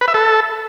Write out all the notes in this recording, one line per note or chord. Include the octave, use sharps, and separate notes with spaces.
B4
E5
A4